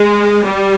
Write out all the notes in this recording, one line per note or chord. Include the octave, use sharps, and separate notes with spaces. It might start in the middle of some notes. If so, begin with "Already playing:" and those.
Already playing: G#3
G3